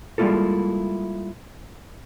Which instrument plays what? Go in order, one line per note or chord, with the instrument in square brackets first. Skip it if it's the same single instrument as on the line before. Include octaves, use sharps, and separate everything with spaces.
[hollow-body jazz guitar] G3 G#3 A#3 E4 F4 A4